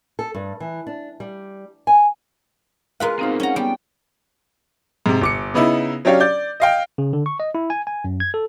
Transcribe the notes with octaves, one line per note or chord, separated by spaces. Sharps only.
A4
G2
E3
D4
G3
G#5
G#3 F4 A#4 B4 F5
B2 A#3 C4 D#4 C5
G2 C#4 F#5 A#5
G3 B3 G5
G#2 C3
G1 D6 C#7
C#3 B3 D#4 E4
F#3 C#4 D4 G4 C#5 F5
D5 G6
D#5 F5 G5
C#3
D3
C#6
D#5
E4
G#5
G#5
F#2
G#6
A4